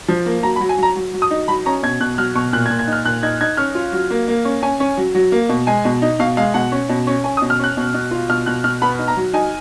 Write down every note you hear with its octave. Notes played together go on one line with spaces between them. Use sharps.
F3
A#3
F#3 A#5
B5
F#3
G#5
F#3 A#5
F#3
F#3
D#6
D#4
F#3 B5
C#4 A#5
B2 G#6
B2 F#6
F#3 F6
B2 C#6
A#2 F#6
G#6
A#2
G#6
D#4
F6
A#2 F#6
D#4 G#6
D#4 G#6
C#4 F6
F4
F#3
A#3
A#3
C#4
C#4 G#5
C#4
F#3
F#3
A#3
B2
G#3 G#5
B2
D#4
B2 F5
G#3 F5
B2 F#5
C#4
B2
C#4
C#4 G#5
D#6
B2
F6
C#4 F#6
B2
B2
F4
B2 F6
B2 F#6
B2 F6
B3 B5
D#4
A#5
F#3
D#4 G#5